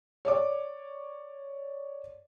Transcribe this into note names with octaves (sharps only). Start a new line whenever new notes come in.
C#5 D5 D6